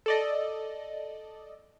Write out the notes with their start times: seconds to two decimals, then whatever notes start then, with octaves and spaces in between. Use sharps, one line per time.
0.06 A4 D5 D#5